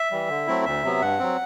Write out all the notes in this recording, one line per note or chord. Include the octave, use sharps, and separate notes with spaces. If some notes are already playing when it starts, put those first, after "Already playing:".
Already playing: E5
E3 G3
D3
F#3 A3 C4 E4
D2 E5
C3 F#3 B3
G2 F#5
F#3 C4